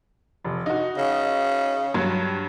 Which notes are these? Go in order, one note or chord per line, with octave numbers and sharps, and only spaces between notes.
F1
D#4 F#4
C#3
G2 F#3